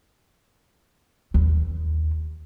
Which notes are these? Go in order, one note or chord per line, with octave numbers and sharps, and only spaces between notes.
D#2